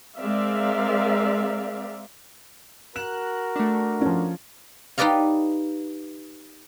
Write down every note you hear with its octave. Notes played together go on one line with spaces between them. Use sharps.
G#3 C4 A#4 D5 E5 F5
F#4 A#4 F#6 E7
A3 D4
F3 C#4
D#4 G4 B4 D5 D#5 F5